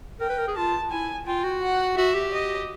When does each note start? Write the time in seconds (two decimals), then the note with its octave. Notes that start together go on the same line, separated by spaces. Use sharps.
0.20 A#4 G5
0.30 B4
0.38 A#4
0.47 G#4
0.56 F4 A5
0.91 E4 G#5
1.26 F4 G5
1.44 F#4
1.62 F#5
1.97 F#4 E5
2.15 G4
2.32 D#5